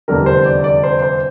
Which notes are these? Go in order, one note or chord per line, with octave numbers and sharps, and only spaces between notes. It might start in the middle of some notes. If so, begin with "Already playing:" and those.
F1 E2 D3 G3 A#4
C5
D5
D5
C5
C5